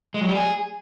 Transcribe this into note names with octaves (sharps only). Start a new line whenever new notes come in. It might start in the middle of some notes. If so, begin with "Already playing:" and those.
G#3
F#3
G3
G#4